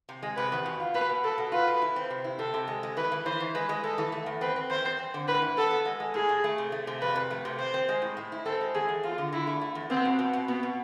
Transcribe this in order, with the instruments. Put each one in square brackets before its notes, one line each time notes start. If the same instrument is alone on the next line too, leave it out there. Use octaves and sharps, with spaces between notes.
[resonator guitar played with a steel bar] C3
G#3
[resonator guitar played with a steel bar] C3 [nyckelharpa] B4
[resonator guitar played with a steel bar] E2
B2
F4
[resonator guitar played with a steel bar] B2 [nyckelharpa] B4
[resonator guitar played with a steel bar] B2
[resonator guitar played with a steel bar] B2 [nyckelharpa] A4
[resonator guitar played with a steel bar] B2
[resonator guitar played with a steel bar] F4 [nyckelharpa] B4
[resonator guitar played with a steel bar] B2
E4
C4
C3
E4
[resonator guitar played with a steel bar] C3 [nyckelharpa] A4
[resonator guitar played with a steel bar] C3
G#3
G#3
[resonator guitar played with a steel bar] E3 [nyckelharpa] B4
[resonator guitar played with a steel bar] E3
[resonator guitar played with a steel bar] E3 [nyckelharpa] C5
[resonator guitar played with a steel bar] E3
[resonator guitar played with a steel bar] G#3 [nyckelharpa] B4
[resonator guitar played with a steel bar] G#3
[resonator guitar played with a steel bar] G#3 [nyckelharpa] A4
[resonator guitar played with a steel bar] E3
A3
E2
[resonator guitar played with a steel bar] C4 [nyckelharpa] B4
[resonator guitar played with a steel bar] C4
[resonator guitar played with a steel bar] E2 [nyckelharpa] C5
[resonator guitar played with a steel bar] C4
C4
D3
[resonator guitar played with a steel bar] A2 [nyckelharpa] B4
[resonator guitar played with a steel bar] E3
[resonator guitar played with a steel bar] B3 [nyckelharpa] A4
[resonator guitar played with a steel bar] B3
G#3
G#3
[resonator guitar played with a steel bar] A2 [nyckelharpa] G#4
[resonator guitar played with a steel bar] A2
A3
C3
A3
C3
[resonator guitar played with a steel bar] F2 [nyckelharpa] B4
[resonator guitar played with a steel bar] C3
A3
C3
[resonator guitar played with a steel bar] C4 [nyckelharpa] C5
[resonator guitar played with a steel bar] C4
G#3
A2
A2
E4
[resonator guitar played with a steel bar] C4 [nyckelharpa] A4
[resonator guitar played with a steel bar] G#3
[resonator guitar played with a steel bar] E2 [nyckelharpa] G#4
[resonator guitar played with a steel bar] E2
[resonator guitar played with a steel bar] E2 [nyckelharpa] F4
[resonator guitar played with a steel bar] D3
[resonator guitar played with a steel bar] D3 [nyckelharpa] E4
[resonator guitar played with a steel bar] A3
A3
E2
[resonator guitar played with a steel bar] B3 [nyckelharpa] C4
[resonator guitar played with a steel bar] B2
B2
B2
[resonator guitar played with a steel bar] B2 [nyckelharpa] B3
[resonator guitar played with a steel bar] B2